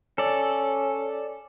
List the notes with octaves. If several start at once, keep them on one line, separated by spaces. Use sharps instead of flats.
C#4 A4 D5